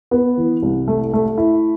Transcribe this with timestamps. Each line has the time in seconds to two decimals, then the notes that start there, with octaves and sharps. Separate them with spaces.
0.11 B3
0.37 E3
0.62 C2
0.88 A3
1.13 A3
1.38 E4